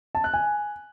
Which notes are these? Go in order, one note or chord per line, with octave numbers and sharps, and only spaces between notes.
A5
F#6
G#5